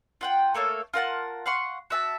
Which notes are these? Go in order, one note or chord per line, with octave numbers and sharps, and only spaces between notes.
F4 F#5 G5
A3 A#3 A4 C#5
F4 A#4 F#5 A5
F5 F#5 C6 C#6
F#4 E5 A5